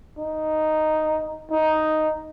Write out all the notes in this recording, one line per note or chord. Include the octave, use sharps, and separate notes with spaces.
D#4
D#4